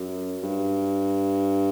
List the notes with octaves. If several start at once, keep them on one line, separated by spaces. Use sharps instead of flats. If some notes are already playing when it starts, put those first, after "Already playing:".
Already playing: F#2
G2